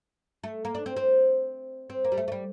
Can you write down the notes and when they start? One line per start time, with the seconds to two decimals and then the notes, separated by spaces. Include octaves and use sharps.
0.43 A3
0.65 A#3
0.75 D4
0.86 C4
0.97 C4
1.90 C4
2.04 A#3
2.12 G3
2.18 A3
2.28 A3
2.32 G3